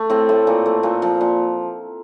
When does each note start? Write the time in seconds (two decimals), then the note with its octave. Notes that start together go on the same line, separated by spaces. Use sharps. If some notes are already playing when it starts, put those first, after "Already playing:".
Already playing: A3
0.10 A2 C4
0.29 A2
0.47 A#2
0.66 A3
0.83 A#2
1.02 F3
1.21 A#2